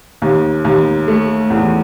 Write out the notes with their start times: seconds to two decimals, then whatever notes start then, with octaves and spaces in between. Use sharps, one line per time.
0.22 D#2
0.65 D#2
1.08 A3
1.50 E2